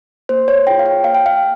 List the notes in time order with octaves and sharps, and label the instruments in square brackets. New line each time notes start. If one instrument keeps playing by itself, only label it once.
[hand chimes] A#3 C5
C#5
F4 G#4 G5
F5
G5
A#3 F5
G5
F5